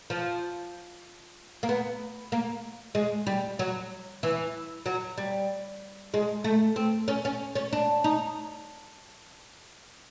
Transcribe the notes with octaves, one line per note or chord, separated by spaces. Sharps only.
F3
A#3
B3
A#3
G#3
G3
F#3
E3
F#3
G3
G#3
A3
C4
C#4
C#4
C#4
D4
D#4